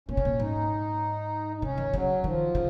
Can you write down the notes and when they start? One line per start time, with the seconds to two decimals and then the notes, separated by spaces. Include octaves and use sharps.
0.08 A#2 C#4
0.17 C3
0.25 A#2
0.40 G#2 D#4
1.56 D#4
1.62 C3 C#4
1.78 D#3
1.93 C#3 F#3
2.24 D#3 F3
2.55 C#3